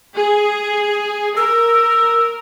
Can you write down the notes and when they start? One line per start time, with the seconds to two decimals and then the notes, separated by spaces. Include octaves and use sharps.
0.15 G#4
1.37 A#4 E6